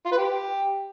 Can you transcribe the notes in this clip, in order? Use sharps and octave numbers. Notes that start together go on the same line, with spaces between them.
F4
B4
G4